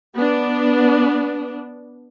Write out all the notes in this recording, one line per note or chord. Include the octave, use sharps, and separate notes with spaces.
B3 D4